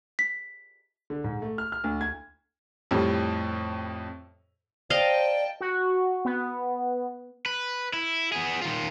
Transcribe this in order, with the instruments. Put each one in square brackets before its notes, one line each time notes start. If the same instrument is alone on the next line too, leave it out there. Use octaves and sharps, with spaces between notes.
[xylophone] B6
[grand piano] D3
G#2
A3
F6
F6
D2
G#6
[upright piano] F2 A2 G3
[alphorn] C5 [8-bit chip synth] D5 [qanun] D#5 F5 A#5 [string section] G5 A5
[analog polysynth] F#4
B3
[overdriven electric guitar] B4
E4
B3 G#4
D#3 F4